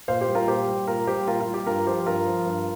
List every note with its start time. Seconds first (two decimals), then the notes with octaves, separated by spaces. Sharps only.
0.08 A#2 C5 F5
0.21 G4 C5
0.28 G3
0.35 F4 A#4
0.48 A#2 G4 C5
0.68 G3
0.87 A#2 F4 A#4
1.07 G3 G4 C5
1.27 A#2 F4 A#4
1.40 F4
1.47 G3
1.54 G4
1.67 G2 F4 A#4
1.86 F3 G4 C5
2.06 G2 F4 A#4
2.26 F3
2.46 G2